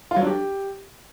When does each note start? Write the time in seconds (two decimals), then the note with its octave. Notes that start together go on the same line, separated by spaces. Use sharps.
0.11 F4
0.16 F#3
0.22 D4
0.27 G4